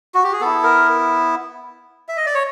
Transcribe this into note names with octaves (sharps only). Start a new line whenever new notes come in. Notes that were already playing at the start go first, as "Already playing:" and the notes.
F#4
G4
G#4
B3 E4 A4
A#4
E5
D#5
D5
C#5